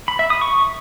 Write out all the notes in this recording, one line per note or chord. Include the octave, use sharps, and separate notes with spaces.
B5
E5
D#6
C#6